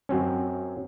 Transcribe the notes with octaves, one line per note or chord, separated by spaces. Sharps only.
F#2 F#3 C4 C#4